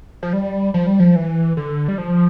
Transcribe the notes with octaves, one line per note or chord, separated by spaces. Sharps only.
F3
G3
F3
G3
F3
E3
D3
G3
F3